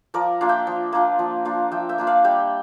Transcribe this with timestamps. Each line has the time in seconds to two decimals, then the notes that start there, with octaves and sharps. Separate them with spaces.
0.14 F3 A#4 D5
0.41 A#3 D4 F4
0.49 E5 G5
0.67 F3
0.92 A#3 D4 F4
1.19 F3
1.45 A#3 D4 F4
1.71 F3 E5 G5
1.89 E5 G5
1.98 A#3 D4 F4
2.07 D5 F5
2.24 G3 E5 G5